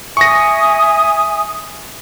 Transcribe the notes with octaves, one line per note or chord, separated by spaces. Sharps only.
E5 G#5 C#6 D#6 A#6